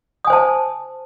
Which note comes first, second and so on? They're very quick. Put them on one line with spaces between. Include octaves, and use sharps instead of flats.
D#6 G#5 C5 A5